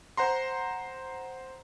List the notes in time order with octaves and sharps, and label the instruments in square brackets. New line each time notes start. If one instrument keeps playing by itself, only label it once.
[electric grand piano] C5 F#5 A#5 C6